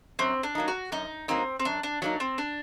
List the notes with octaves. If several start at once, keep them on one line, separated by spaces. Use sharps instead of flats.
F#2 C4
D4
F#3 A#3 D#4
F#4
F#2 D#4
F#3 A#3 C4 D#4
C4
F#2 D4
D4
F#3 A#3 D4 D#4
C4
D4